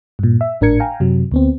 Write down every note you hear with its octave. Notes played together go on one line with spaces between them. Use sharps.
G2 A#2
E5
G#1 A2 D4 A#4 G#6 C#7
F5 G5 G#5 A#5
F#2 C3 F#3
D2 B3 C4